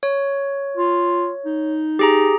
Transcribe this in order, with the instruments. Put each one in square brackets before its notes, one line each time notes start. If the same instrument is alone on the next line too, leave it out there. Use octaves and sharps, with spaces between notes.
[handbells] C#5
[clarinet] F4
D#4
[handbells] G4 G#4 A#5